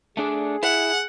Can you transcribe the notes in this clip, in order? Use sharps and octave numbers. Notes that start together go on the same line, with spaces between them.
A3 D4 G#4 D5
E4 F#5